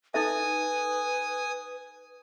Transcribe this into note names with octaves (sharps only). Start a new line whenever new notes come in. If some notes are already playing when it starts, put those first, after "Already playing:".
D#4 A4 B4 E5 G#5 D#6